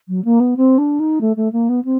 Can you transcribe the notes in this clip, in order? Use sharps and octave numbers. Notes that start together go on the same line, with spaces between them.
F#3
A#3
B3
C4
D4
D#4
A3
A3
A#3
B3
C4